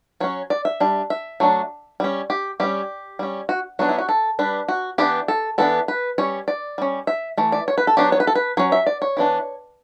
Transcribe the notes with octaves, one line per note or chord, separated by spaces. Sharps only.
F#3 C#4 C#5
D5
E5
G3 D4
E5
F#3 A3 D4
G3 C#4
G4
G3 C#4 G4
G3 C#4
F#4
F#3 B3 D4 F#4
E4
F#4
A4
G3 D4 B4
F#4
E3 B3 D4 G4
A4
E3 B3 D4 A4
B4
G3 C#4 C#5
D5
G3 C#4
E5
E3 A3
D5
C#5
B4
A4
F#3 B3 D4 G4
C#5
B4
A4
B4
F#3 C#4 C#5
E5
D5
C#5
E3 B3 D4